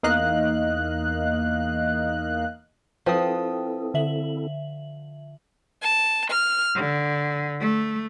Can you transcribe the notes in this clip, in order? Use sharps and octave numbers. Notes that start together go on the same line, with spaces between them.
E2 A#3 D#4 D#5 F5 F#6
F3 C4 E4 A4 B4 G5 D#6
D3 E5 F#7
A5
F6
D3
A3